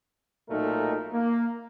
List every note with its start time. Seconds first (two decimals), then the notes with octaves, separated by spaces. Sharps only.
0.50 B1 A#2 A3 D#4 A#4
1.13 A#3